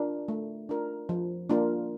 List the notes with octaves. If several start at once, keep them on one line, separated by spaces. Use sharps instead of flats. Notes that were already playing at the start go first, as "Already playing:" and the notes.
Already playing: D4 F4 A#4
A3
D4 F4 A#4
F3
A#3 D4 F4 A#4